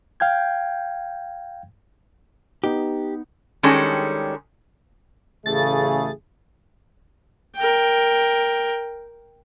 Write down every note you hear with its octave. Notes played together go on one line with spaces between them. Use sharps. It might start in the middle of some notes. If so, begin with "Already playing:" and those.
F5 G5 G6 G#6
B3 D#4 G4
D#3 G3 G#3 C#4 D4 A4
A1 C#3 A3 G#4 A6
A#4 G5